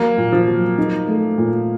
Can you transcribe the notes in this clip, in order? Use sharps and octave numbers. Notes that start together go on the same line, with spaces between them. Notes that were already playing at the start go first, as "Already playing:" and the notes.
Already playing: F#3 A#3
A#2
F3
F#3
D#4
A3
A#2